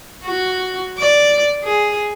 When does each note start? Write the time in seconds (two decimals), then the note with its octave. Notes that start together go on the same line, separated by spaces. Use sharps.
0.24 F#4
0.98 D5
1.63 G#4